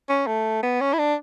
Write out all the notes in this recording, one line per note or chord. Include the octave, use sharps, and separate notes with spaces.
C#4
A3
B3
C#4
E4
D4